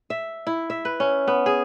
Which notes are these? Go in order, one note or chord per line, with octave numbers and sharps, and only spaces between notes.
E5
E4
E5
B4
C#4
B3
G#4